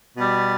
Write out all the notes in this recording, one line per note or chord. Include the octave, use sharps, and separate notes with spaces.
B2 G3